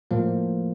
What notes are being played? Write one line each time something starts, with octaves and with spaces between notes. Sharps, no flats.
A2 F3 A#3